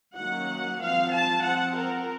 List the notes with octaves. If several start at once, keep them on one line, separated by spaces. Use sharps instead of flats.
D#3 F#3 A#3 C#4 F#5
F3 C4 F5
A5
F3 C4 F#5
A#4